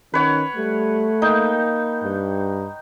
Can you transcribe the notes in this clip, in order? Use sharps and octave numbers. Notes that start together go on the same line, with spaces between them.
D#3 C#4 B4 C#5 F#5
G3 A3
A#3 D#4 G5
G2